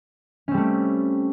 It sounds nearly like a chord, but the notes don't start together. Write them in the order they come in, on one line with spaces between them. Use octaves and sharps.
C#4 C4 G3 A3